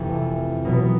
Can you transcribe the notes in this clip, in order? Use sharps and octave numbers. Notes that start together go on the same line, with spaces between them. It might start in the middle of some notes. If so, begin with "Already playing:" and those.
Already playing: F2 C3 E3 A3 D4
B2 F#3 B3